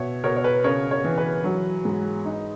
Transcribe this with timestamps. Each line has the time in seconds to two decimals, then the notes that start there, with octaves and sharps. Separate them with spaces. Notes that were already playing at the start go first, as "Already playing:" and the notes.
Already playing: B2 C#5 E5
0.24 B2 A#4 C#5
0.36 C#5
0.44 B4
0.64 C#3 A#4 C#5
0.91 A#4 C#5
1.05 E3
1.18 B4
1.44 F#3
1.85 G#2
2.25 D#4